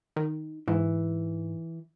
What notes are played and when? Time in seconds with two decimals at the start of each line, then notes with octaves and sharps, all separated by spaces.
0.16 D#3
0.68 G#2 E3